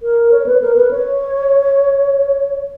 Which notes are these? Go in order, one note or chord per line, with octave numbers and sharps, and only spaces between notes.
A#4
C#5
B4
A#4
B4
C#5